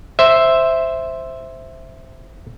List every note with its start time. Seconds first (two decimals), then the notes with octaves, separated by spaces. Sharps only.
0.19 C5 E5